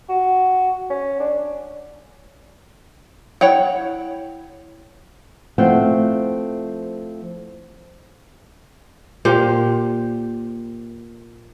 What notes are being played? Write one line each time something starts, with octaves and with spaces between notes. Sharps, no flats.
F#4
C#4
D4
E4 C#5 F#5 G5
F3 A3 C4 E4 F#5 G5
A#2 G4 C5